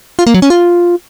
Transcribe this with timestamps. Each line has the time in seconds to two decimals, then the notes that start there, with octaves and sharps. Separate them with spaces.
0.19 F4
0.27 A#3
0.34 F#3
0.42 C#4
0.50 F4